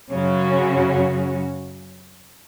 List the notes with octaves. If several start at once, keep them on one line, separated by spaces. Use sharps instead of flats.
F#2 C#3 F#3 C#4 F#4